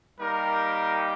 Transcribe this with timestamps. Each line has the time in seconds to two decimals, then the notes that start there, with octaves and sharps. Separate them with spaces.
0.19 G3 A#3 D#4 G4 A#4